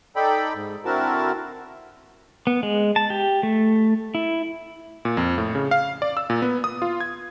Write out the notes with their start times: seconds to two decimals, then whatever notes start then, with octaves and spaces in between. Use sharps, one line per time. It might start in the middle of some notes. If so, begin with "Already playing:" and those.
0.16 D#4 A4 D5 G5 B5
0.54 G#2
0.85 D3 C4 E4 F#4 A#4 A5
2.47 B3
2.63 G#3
2.96 A5
3.10 G4
3.43 A3
4.15 E4
5.05 A#2
5.17 F2
5.38 A2
5.55 C#3
5.71 F5
6.02 D5
6.17 E6
6.30 A#2
6.42 B3
6.64 D#6
6.82 F4
7.00 G#6